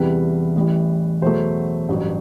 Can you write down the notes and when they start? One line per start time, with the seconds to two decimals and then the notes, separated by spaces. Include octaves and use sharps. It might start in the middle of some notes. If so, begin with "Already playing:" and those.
Already playing: E2 C3 E3 G3 B4
0.55 A1 A2 E3 G3
1.22 E2 B2 F#3 A3 C5
1.89 A1 G2 F#3